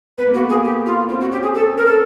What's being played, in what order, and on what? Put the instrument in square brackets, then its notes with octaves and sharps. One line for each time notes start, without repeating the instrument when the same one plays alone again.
[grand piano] B3 [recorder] B4
[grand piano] A#3
[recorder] F#4
[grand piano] A3
[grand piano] A#3 [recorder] G#4
[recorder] G4
F4
[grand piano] C4 [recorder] F4
[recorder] F#4
[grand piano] C#4 [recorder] G4
[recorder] G#4
[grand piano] C#4 [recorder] A4
[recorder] A#4
A4